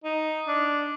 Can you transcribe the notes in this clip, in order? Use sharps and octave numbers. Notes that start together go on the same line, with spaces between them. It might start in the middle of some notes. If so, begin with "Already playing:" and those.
D#4
D4